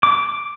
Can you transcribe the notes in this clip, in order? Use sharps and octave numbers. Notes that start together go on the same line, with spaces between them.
D6